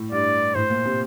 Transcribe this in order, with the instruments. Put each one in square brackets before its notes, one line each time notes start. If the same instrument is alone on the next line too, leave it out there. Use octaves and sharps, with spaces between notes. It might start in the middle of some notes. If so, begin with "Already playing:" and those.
Already playing: [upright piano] A2
[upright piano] G2 [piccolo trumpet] D5
[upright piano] A2 [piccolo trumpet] C5
[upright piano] A#2
C3